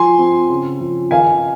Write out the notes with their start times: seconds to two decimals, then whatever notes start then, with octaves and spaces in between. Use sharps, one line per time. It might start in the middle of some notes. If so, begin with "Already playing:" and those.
Already playing: F3 G#5 C6
0.18 C4
0.49 C#3
0.80 F3
1.11 D#3 F5 G#5